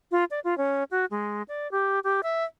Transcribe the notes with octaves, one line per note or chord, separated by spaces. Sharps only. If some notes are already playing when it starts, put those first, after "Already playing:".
F4
D5
F4
C#4
F#4
G#3
D5
G4
G4
E5